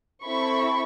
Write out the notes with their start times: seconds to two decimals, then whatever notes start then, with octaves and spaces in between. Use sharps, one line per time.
0.24 C4 E4 A4 B5 C#6